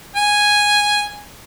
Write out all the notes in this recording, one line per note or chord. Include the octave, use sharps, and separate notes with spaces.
G#5